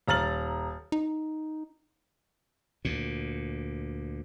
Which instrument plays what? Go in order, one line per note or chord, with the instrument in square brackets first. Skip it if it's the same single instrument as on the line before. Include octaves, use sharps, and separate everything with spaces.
[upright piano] D#1 A#5 F6 A6 F#7
[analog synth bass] D#4
[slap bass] D2 A#2